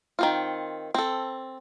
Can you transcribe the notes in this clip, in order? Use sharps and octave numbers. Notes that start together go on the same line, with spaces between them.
D#3 C4 F4
C4 A4